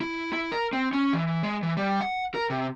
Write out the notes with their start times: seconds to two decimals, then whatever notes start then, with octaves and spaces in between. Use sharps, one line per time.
0.01 E4
0.33 E4
0.52 A#4
0.73 C4
0.93 C#4
1.13 E3
1.43 G#3
1.63 E3
1.77 G3
2.01 F#5
2.35 A#4
2.50 C3